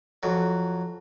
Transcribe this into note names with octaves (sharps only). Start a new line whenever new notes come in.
F2 F#3